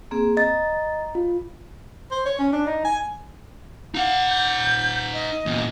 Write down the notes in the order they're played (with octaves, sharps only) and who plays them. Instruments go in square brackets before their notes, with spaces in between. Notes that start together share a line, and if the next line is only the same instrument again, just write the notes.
[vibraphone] A#3 C4 G#4
[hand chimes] D#5 A6 [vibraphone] A#5
[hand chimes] F4
[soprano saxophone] C5
C#5
C#4
D4
D#4
G#5
[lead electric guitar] D#4 F#5 [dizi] F5
[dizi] G6
D#5
[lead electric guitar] E2 A#2